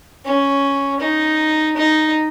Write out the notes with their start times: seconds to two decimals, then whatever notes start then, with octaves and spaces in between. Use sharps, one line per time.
0.25 C#4
1.00 D#4
1.77 D#4